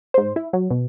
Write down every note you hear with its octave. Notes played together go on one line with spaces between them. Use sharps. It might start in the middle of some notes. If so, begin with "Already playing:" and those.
G#2 C5
E4
F#3
B2